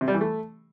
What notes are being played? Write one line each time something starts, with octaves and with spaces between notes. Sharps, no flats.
C3
G3
E3
A3